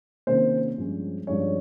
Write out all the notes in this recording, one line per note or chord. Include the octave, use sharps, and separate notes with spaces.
C3 D#3 A#3 C#4 C5
G2 F3 G#3 C#4
G2 F3 G#3 C#4 C#5